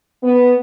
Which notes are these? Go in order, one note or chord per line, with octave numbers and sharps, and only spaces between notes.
B3